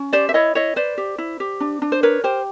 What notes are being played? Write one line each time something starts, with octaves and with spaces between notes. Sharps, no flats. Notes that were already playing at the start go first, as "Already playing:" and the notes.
Already playing: C#4
G4 C5 D5
E5
E4 C#5 D#5
E4 C#5 D#5
B4 C5 D5
G4
E4
G4
D4
D4
C5
A#4 B4 C#5
G4 C5